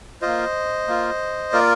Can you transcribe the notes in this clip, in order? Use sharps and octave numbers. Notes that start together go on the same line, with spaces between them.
A#3 F4 C5 D#5
A#3 F4
A#3 F4 A#4 D5